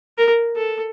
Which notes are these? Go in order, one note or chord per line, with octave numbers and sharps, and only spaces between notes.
A#4
A4